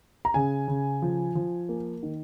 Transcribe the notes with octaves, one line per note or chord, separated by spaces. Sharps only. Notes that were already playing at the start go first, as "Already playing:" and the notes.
A#5
C#3 G#5
C#3
F3
F3
A#3
D#3